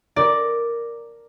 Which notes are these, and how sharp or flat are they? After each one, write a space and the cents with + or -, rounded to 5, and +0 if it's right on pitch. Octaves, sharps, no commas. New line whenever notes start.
A#4 +0 D5 +0